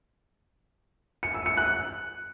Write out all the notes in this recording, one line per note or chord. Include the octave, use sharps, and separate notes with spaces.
C#7
E6
C#7
F#6